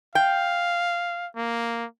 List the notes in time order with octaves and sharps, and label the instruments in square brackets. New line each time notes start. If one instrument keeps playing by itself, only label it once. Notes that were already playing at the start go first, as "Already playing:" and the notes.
[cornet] F5 [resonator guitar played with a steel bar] G5
[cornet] A#3